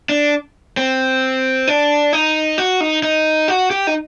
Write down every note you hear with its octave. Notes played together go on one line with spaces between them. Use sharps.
D4
C4
D4
D#4
F#4
D#4
D#4
F#4
G4
D#4